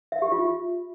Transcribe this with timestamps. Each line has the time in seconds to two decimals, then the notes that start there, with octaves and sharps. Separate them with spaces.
0.12 E5
0.22 G4
0.32 F4